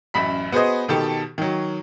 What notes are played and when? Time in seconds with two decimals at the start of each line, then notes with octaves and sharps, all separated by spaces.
0.14 A1 F#2 B5 B6
0.52 B3 F#4 G#4 B4 C5 D#5
0.88 B2 D#3 G4 A4 A5
1.38 D#3 F#3